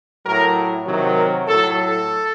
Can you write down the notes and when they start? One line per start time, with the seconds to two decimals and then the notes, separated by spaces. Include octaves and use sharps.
0.24 A2 F#3 A#4
0.86 C3 D#3 F#3
1.16 A#4
1.47 A2 F#3 A4
1.77 A4